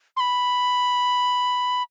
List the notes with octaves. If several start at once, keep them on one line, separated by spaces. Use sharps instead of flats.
C6
B5